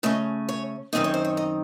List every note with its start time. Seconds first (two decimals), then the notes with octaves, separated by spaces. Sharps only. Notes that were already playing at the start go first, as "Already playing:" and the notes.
0.03 C#3 A3 C#4 D#5
0.49 C#5
0.93 F#2 D#3 F#3 C4 D#4 D#5
1.04 C#5
1.14 C5
1.24 C#5
1.37 D#5